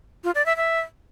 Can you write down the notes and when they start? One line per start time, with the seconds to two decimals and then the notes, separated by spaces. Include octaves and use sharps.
0.24 F4
0.35 D5
0.46 E5
0.57 E5